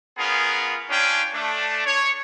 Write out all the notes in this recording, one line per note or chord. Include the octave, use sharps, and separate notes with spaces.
B3 C#4 F4 G#4 A#4
C#4 D4 F4 G5 G#5
A3 D4
C#5